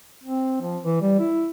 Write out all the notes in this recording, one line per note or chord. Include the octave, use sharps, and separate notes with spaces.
C4
F3
E3
G3
E4